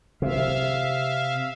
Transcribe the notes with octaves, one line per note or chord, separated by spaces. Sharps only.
C3 E5 F5